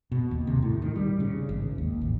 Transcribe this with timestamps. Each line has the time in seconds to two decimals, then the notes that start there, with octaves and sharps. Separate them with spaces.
0.12 B2
0.31 D#2
0.47 C3
0.62 A2
0.82 D#3
0.96 G3
1.20 C#3
1.49 G#1
1.78 D#2
2.01 A1